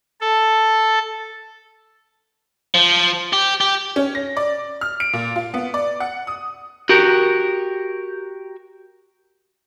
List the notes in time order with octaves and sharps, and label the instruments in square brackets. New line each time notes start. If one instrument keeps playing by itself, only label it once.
[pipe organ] A4
[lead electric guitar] F3
G4
G4
[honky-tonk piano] C#4
A#6
D5
F6
D7
A#2
F4
B3
D5
F#5
D#6
[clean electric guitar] F#4 G4 A#4